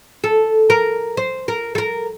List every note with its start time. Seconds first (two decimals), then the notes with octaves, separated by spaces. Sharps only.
0.24 A4
0.70 A#4
1.17 C5
1.48 A#4
1.75 A4
1.78 A#4